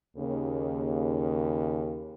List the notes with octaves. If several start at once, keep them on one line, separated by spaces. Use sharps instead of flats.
D#2 C#3